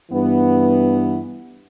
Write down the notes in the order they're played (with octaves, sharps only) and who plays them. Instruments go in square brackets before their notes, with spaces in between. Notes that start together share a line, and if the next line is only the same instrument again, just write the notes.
[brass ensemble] G2 E3 B3